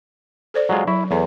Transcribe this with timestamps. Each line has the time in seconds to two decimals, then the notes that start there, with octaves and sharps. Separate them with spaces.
0.54 A4 C5 D5
0.69 F#3 G#3 F4
0.87 F#3 E4
1.11 E2 A4 B4 C#5